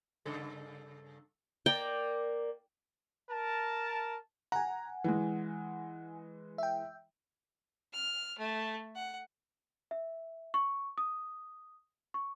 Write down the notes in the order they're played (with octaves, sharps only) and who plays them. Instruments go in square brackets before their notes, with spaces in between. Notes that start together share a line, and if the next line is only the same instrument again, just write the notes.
[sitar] G2 C#3 A4
[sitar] A#3 A#4 D5 [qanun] G5
[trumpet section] A#4 A5
[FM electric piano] F#5 G#5 [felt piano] A#5
[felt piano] E3 G#3
[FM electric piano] E5 G5
[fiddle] F6
A3
F#5
[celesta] E5
C#6
D#6
C#6